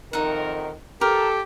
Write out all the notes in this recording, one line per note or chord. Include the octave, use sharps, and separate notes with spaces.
F2 D#3 D#4 A#4 E5 F#5
G4 A4 A#4